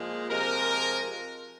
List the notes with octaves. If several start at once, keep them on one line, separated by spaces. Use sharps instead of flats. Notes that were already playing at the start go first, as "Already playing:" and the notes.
Already playing: A#2 F3 G#3
C3 F3 G#3 A#4